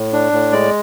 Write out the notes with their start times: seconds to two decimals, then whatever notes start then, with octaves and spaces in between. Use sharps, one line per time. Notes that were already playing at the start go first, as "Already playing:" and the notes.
Already playing: A2
0.13 D4
0.32 A2
0.52 G#3 D5